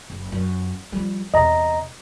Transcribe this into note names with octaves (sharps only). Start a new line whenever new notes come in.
F#1
F#2
F3 G3
E2 C3 D#5 A#5